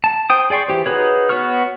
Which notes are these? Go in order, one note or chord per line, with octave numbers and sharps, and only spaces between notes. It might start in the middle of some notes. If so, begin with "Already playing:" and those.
A5
C5 G5 D#6
G#4 D5 G5 C6 C#6
E3 G4 C5
D#4 F#4 G#4 B4 C#5
B3 F#4 C#5 C#6 F6